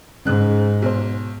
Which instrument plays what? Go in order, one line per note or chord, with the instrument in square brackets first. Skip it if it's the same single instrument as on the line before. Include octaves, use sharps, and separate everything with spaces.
[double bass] G#2 [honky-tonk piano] C#3 F#6
[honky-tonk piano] B1 C5